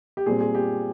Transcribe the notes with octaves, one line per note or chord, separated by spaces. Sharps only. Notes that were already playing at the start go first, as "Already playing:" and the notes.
G4
A#2 G3 C4 G#4
G#4
G4